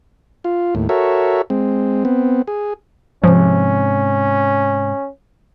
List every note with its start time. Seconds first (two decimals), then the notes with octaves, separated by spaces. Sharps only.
0.44 F4
0.75 D#2 A2
0.89 F#4 A4 A#4 C#5 E5
1.50 G#3 C4
2.05 B3 C4
2.47 G#4
3.24 G#2 C3 F3 C#4